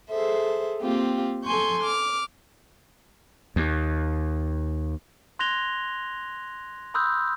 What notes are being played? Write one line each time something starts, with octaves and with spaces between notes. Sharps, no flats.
G#4 A4 C5 E5
A#3 C4 F4 G4
A4 G#5 C6 C#6 G6
D6 F6
D#2
C6 F#6 G#6 A#6 F7 G7
B5 C6 D#6 E6 F#6 G6